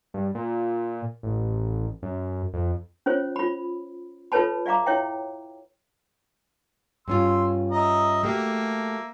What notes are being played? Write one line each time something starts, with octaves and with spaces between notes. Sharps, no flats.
G2
A#2
A1
F#2
F2
C#4 F4 C5 C#5
F4 B5
F4 A4 B4 C#5 A5 B5
D5 E5 F5 A#5 D6
E4 C#5 E5 G5
G2 C#4 F4 C6 E6
D#5 E5 A#5
A3 A#3 F#4 G4 E5